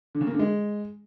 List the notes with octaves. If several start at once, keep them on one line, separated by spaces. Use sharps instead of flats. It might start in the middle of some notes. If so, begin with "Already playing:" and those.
D3
C#3
A#3
D3
G#3